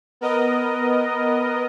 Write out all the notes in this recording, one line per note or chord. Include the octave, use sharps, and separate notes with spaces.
B3 A#4 D#5